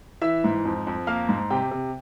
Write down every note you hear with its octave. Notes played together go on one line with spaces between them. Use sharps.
E3 E5 E6
G#2
F2
F2
A#3 F5 F6
G#2
C3 G4 G5
C3